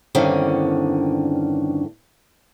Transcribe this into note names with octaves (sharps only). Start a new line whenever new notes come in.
E2 G2 D3 D#3 C4 C#4